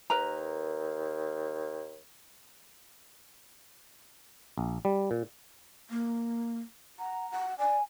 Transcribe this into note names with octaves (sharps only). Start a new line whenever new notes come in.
D#2 A#4 B4 A#5
A#1
G3
A#2
A#3
F#5 A#5
F#5
D5 G#5